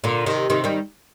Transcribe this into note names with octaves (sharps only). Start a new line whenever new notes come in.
A#2 D3
C3 D#3
C3 D#3
D#3 G3